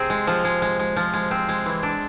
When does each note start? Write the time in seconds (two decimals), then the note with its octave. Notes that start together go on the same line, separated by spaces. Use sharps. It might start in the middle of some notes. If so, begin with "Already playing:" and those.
Already playing: C3 C4 G#4
0.10 G#3
0.27 F3
0.45 G#3
0.62 G#3
0.79 G#3
0.96 F3
1.14 G#3
1.31 C4
1.49 G#3
1.66 E3
1.83 D4